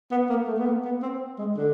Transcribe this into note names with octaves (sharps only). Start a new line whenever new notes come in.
B3
A#3
A3
B3
A#3
B3
C4
G#3
D3